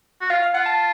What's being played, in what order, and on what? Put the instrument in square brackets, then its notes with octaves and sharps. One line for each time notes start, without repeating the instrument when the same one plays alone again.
[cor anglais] F#4
[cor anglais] F4 [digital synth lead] F5
[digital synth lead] F5
[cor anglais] F4 [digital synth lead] F#5
[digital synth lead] A5